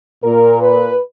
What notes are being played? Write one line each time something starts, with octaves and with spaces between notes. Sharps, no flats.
A#2 A#4
B4